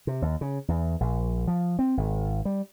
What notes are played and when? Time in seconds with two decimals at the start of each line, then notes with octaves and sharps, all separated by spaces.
0.07 C3
0.22 D#2
0.41 C#3
0.68 E2
1.00 A#1
1.47 F3
1.79 C4
1.97 G#1
2.45 G3